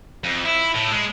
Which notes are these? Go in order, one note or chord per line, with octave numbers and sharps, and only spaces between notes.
F2
E4
A2
G#3